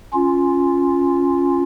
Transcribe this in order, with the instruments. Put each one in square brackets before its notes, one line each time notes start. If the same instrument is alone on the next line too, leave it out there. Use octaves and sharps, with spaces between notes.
[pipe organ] C#4 F4